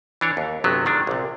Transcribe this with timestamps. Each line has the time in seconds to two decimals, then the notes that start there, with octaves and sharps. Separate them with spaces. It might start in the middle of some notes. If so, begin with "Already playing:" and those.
0.21 E3 D4 C#5
0.37 D#2
0.64 G1 C3 F#3 B3
0.86 D3 D#3 G#3 D4
1.07 A#1 C3